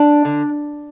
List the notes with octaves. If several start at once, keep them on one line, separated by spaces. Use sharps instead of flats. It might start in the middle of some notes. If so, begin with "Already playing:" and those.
Already playing: D4
D3